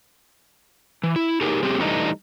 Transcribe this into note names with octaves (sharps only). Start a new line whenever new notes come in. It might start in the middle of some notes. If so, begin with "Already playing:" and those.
E3
E4
D#4 G4 G#4 A#4
G3 C4 G4 G#4
E3 G3 A3 D4 D#4